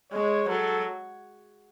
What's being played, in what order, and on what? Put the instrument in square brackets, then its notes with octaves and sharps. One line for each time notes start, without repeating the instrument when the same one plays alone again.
[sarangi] G#3 [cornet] C#5
[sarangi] F#3 [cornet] A4